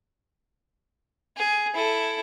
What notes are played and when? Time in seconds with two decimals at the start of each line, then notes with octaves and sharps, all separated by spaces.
1.37 G#4
1.74 E4 A4